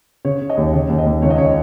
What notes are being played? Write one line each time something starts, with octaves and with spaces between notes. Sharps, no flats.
C#3 C#5
C#3
D#5
D#2
C#3 D#5
D#2
D#5
D#2
C#2 C#5
D#5
C#3 C#5
D#5